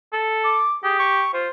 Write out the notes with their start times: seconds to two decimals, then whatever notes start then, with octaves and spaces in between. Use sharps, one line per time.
0.13 A4
0.45 D6
0.84 G4 G#4
0.99 C#6
1.34 F4 C5